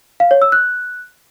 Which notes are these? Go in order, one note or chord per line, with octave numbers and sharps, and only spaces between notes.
F5
C#5
E6
F#6